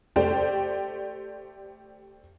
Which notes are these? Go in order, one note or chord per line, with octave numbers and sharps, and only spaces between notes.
A3 G4 C5 D5 G5